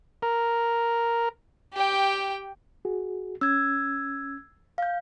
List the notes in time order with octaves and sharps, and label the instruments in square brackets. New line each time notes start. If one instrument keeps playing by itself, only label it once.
[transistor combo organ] A#4
[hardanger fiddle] G4 G5
[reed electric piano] F#4 G#4
[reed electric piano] C#4 [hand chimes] E6 G#6
[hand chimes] F5 G6